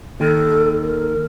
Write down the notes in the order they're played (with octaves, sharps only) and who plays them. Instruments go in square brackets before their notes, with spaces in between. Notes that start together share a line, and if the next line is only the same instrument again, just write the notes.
[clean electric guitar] D#2 D#3 [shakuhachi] A4
[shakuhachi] A#4